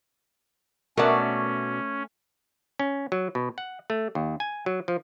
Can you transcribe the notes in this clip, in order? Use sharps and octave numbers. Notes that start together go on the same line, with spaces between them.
B2 A3 C#4 A#4 D5 E5 F#5
C#4
F#3
B2
F#5
A3
D#2
G#5
F#3
F3